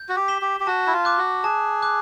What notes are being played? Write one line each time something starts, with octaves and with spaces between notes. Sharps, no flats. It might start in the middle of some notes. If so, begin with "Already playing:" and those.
Already playing: G6
F#4
G4
B6 E7 G7
G4
G4
F#4 A5
E4
F4
D6 F#6
F#4
G#4 A5
D6 F#6